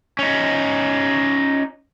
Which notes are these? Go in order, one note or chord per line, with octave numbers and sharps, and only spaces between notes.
C#4 D#4